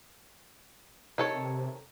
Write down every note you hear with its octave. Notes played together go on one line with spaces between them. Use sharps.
C3 D#3 A4 C#5